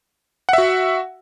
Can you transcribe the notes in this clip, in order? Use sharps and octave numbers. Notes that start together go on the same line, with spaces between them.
F#4 E5 F#5